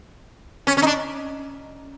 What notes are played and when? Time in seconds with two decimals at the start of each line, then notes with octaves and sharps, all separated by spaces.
0.67 C#4
0.77 C#4
0.82 D#4
0.87 D4